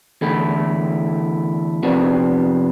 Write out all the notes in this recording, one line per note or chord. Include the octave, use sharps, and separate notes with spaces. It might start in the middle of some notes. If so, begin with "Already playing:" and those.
E2 D3 A3 E4
F2 C3 F3 B3 D4